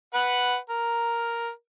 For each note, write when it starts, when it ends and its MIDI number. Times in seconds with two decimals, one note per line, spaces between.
0.14 0.56 71
0.14 0.56 78
0.70 1.49 70